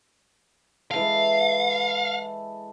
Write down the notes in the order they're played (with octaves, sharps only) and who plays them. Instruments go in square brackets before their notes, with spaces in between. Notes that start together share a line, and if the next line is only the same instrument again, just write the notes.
[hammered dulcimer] E3 G#3 A4 [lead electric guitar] F5